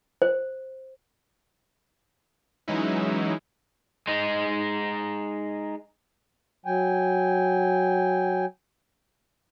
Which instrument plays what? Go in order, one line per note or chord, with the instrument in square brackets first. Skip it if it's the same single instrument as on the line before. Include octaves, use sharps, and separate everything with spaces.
[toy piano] C5
[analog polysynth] E3 F#3 G#3 C#4 D#4 E4
[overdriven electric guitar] G#3 D#4
[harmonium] F#3 G5 G#5